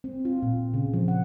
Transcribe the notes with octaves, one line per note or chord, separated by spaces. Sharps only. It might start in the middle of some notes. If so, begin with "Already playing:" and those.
C4
F4
A#2
C#3
F3
F#5